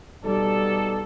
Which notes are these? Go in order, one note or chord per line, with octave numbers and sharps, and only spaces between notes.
B2 G3 D#4 A4